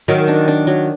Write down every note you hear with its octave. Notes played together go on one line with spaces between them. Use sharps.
D#3 F#3
D4
D4
F#3